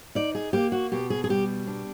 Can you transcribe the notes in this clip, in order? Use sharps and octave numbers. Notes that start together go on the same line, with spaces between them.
D#4 D5
G#4
A#3 G4
F#4
B2 G4
G#4
G#4
G3 G4
D4